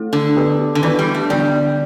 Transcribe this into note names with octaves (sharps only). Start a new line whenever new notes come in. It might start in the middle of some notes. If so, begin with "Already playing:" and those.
Already playing: A3 E4 A4
D3
B3 D4 G4 B4
D3
E3 B3 D4 B4 D5
G3
A3
D3 G3 B3 D4 G4 D5